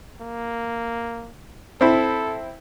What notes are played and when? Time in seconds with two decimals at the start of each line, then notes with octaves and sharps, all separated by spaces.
0.21 A#3
1.81 C4 E4 A4